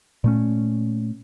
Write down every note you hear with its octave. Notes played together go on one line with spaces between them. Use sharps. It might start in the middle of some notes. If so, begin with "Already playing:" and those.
A#2 A3 C#4